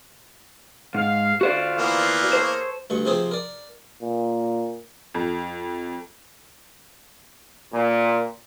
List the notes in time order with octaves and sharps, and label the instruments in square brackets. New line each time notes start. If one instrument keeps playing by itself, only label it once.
[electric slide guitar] G#2 [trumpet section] F5
[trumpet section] F4 F5 [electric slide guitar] F#4 C5 D5
[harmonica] E3 A#3 B3
[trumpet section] G#4 A4 C#5 [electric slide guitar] C5
[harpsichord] D2 G2 C#6
C3 F3 C4 G4 G#4 C5
A#4 D5
[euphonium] A#2
[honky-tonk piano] F2
[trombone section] A#2